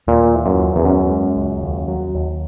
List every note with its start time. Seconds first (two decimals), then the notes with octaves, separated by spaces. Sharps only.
0.07 D#2 A#2
0.34 E3
0.46 F#2
0.60 D#2
0.76 E2
0.85 F#2 C#4
1.11 G#3
1.37 C#2
1.62 D#2
1.88 F#3
2.14 D#2